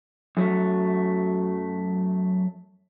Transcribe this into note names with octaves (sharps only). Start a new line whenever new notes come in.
F#2 F#3 A3